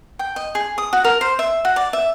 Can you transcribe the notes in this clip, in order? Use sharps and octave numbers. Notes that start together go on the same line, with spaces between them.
G5
D#5
G#4
D#6
F#4
A#4
C5
E5
F#4
D5
E5